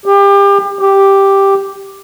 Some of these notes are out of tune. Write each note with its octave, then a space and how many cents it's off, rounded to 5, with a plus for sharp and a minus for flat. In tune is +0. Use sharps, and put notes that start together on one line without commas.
G4 +30
G4 +0